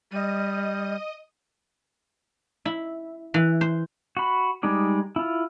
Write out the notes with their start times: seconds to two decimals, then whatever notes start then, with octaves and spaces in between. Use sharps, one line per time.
0.11 G3 D#5 D#7
2.65 E4
3.34 E3
3.61 C5
4.17 F#4 B5
4.63 G3 G#3 D#4 D5
5.16 E4 F4